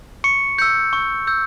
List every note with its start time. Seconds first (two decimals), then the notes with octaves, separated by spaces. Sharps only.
0.24 C#6 C#7
0.58 E6 G6 C#7
0.93 C#6
1.27 E6 G6